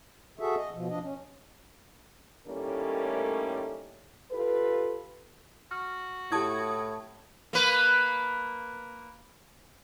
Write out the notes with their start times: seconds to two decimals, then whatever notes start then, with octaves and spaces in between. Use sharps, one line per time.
0.39 F#4 G#4 A4 E5
0.57 D#5
0.74 B2 F3
0.89 F3 D4 D#5
1.03 C#4
2.47 A2 D#3 G3 A3 A#3 C#4
4.32 F4 G4 A4 B4
5.71 F#4 F6
6.32 A2 E4 G4 A5 D#6 G#6
7.53 A#3 B4